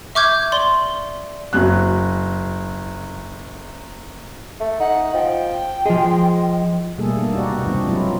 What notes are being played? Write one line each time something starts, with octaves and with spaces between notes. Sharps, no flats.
E5 C#6 D6 F6 G6 G#6
D5 C6 F#7 G7
F#1 F#3 F#6
A3
D#4 F#5
F3 G5
F3 G#3 G#4
B2 G3 A3 A#3 G#4 A4
A#3 D4 A4
D#4 F#4 G4 D5
C3 B3
E3 G3 C4 D4 F4
F#3 G#3 E4 F4